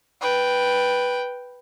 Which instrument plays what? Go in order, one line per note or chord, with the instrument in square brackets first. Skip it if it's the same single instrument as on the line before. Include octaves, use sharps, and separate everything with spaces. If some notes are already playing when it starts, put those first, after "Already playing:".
[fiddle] B4 G5